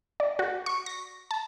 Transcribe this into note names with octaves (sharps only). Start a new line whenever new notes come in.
D5
F#4
C#6
A#6
A5